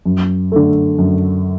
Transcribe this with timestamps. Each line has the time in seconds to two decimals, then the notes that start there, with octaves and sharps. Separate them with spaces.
0.05 F#2
0.52 D3 A3
0.98 F#2